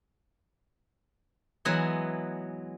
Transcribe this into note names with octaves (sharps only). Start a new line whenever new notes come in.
E3 F#3 G#3 B3 G#4